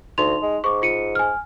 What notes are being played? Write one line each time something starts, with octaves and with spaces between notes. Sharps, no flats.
D2 D#4 C6 F7
G#3
G#2 C#6 D6
F4 C#7 D#7
G#5 F6